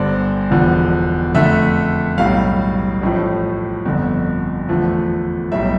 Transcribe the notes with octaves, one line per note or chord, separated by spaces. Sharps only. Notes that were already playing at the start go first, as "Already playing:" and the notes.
Already playing: G1 G2 D3 C5 D5
E1 E2 D3 F3
F2 D3 A3 E5
B1 A2 G3 F5
A1 A2 F3 A3
G1 F2 D3
E2 D3 F3 A3
B1 A2 G3 E5